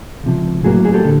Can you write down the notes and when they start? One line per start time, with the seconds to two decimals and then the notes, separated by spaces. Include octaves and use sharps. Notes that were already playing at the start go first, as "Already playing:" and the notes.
0.24 C#2 C3 F3
0.64 A2 F#3 A#3 F#4 G#4
0.84 F#4 G#4
0.94 G4 A4
1.05 D3